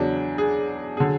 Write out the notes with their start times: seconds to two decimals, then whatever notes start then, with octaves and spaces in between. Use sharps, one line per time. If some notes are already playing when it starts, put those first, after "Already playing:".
Already playing: E2 C#3 F#3 D4
0.38 G#4
0.97 D3 F#3 G#4